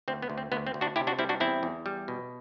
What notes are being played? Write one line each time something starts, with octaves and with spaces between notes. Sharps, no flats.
D2 C4
B3
D2
C4
D2 B3
C4
D2
D4 F#4
C3 E4 G4
D4 F#4
G3 C4 E4
D4 F#4
E2 C4 E4
E2
G3
B2